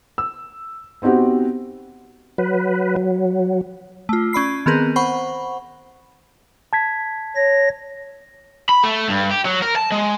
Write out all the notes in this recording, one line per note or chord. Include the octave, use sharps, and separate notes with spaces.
E6
B3 C4 D#4 F#4 G4
F#3 B4
F#3
A3 F4
C#4 D5 B5 C7
D#3 B3 C4 G#4 A#4 B4
C5 F#5 B5 C#6
A5 G#6 B6
C#5 A#6
B5
A3
G2
G4
F#3
A#4
A5
G#3